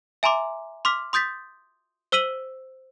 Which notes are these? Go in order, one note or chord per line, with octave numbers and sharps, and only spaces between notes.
E5 G#5 A#5 C6 D6
C6 D6 F6 B6
C6 D#6 G6 A6 B6
C5 E6 B6 D#7 F#7